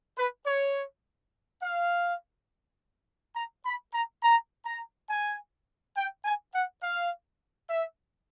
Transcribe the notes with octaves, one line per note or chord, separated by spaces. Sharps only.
B4
C#5
F5
A#5
B5
A#5
A#5
A#5
G#5
G5
G#5
F#5
F5
E5